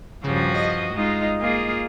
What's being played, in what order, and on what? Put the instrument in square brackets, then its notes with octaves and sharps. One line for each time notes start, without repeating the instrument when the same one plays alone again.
[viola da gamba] G2 F3 F#4 [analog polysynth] C#3 G3
[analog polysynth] D#5
[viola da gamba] G#3 D#4 F4
A#3 F4 G#4